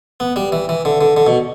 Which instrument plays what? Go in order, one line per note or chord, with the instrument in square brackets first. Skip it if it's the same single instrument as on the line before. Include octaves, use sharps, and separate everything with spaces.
[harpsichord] B3
G3
E3
E3
D3
D3
D3
B2